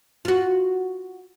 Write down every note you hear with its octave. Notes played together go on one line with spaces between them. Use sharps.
F4 F#4